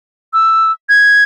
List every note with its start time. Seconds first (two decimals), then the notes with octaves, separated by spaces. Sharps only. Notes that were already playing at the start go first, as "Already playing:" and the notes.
0.33 E6
0.89 G#6